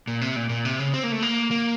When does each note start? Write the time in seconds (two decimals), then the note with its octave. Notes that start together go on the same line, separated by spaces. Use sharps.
0.08 A#2
0.21 C3
0.36 A#2
0.49 A#2
0.65 C3
0.79 C#3
0.94 C4
1.03 A#3
1.12 A3
1.22 A#3
1.51 A#3